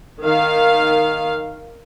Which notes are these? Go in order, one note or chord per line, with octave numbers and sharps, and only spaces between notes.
D#3 F5